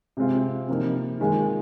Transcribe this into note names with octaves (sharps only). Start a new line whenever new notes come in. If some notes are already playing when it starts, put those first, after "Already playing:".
C3 G#3 C4 F4
C3 F3 A#3 D#4
D#3 G#3 F4